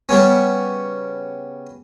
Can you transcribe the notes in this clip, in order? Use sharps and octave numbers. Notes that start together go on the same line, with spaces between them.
C#3 G3 B3 C#4